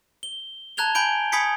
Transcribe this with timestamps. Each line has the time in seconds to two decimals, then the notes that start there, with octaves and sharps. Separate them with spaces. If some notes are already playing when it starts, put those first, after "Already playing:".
0.23 G7
0.77 A5 A#5 F#6 G#6 F7 G7
0.95 G#5 B5 G6 D7 G7
1.32 G#5 B5 D#6 G#6 B6 C#7